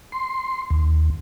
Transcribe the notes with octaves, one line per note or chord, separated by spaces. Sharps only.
C6
D#2